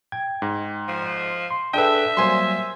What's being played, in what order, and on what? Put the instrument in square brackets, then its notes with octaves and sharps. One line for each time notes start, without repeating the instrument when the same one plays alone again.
[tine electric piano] G5 G#6
[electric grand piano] G#2
[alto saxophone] F3
[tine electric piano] C6
[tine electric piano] D4 G#4 A4 [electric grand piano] B4 G5 [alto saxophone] E5
[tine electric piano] F#3 G3 A#3 [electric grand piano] C5 G#5 C6